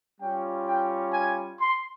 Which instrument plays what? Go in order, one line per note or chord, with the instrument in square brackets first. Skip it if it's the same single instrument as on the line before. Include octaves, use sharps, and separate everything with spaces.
[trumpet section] G3 C#4 F4 G5
G5
G#5
C6